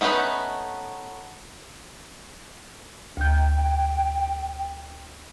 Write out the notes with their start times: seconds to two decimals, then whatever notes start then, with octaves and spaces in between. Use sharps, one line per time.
0.01 A3 B3 C#4 D#4 B4
3.17 D2 G5 G6